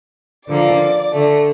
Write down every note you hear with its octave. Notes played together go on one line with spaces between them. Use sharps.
D3 F3 A#3 D5
D3 A3